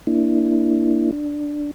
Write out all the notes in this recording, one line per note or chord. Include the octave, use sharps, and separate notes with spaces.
A#3 D4 E4
D4